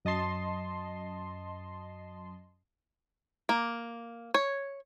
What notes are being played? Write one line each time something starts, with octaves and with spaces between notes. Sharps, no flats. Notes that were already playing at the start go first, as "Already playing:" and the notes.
F#2 D#5 A5 C6
A#3
C#5